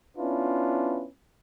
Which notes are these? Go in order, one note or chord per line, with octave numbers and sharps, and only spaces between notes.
B3 C#4 D4 E4 F4 B4